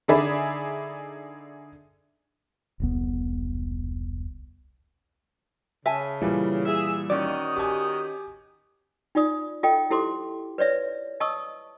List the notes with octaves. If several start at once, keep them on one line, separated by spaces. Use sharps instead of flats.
D3 D#4 G#4 D5 E5 B5
E1 C2 B3
C#3 E5 G#5 A5
A#2 E3 G3
G#4 E5
D#3 C#4 F#4 D5 D#5
G4 G#5
D#4 F4 D5 D#6
F4 A4 D#5 G5
E4 G4 A4 C5 C6 D6
B4 C#5 D5 E5
D#5 A5 C#6 D#6 E6